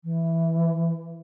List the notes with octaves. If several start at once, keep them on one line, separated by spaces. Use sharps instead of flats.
E3